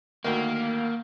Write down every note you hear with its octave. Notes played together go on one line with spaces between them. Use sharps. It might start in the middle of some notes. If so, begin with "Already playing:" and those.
D2 D#3 A#3